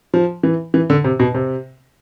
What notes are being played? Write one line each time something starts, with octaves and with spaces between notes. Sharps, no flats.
F3
E3
E3
D3
C3
B2
C3